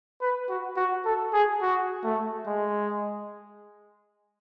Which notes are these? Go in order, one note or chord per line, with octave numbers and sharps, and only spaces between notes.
B4
F#4
F#4
A4
G#4
F#4
A3
G#3